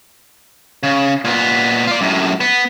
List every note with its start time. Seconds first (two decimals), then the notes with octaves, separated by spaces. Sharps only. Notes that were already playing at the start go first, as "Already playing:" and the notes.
0.83 C#3
1.25 A#2 B3
1.87 F4 D5
2.01 F#2 A2
2.40 B3